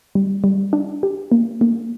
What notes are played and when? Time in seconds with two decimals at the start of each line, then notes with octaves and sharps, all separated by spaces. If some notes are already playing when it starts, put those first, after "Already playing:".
0.15 G3
0.44 G3
0.73 D4
1.03 G4
1.32 A#3
1.61 A#3